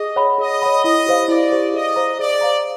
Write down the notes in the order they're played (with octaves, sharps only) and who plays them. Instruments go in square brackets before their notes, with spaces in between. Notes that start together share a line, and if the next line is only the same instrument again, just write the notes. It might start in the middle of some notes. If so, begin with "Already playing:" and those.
Already playing: [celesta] G#4 [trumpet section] D#5
[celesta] C#5 F#5 B5
[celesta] G#4 [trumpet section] D#5
[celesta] C#5 F#5 B5
[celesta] E4 [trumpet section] D#5
[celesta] G4 C5 F5
[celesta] E4 [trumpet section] D5
[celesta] G4 C5 F5
[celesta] G#4 [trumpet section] D#5
[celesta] C5 F5 A#5
[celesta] G#4 [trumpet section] D5
[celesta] C5 F5 A#5